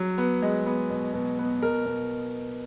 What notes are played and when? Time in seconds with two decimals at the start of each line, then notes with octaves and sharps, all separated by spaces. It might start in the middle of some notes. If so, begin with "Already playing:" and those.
Already playing: F#3
0.18 B3
0.42 G#3
0.66 B3
0.90 B2
1.14 B2
1.39 B3
1.62 B2 A#4
1.86 B2